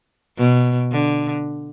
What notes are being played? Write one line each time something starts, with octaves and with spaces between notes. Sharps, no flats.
B2
D3